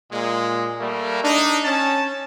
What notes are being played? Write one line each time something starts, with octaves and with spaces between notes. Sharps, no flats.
A#2 G#3
G3 A3 A#3
D4 D#4
C#4 A5